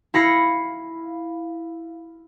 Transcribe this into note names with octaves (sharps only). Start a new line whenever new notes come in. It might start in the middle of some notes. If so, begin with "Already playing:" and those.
E4 F5 B5 A#6 C#7